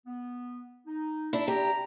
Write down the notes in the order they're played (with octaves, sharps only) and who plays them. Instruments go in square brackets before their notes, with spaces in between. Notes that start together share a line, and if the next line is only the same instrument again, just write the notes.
[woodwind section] B3
D#4
[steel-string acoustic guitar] D4 E4
[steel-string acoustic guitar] G4 [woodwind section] A#5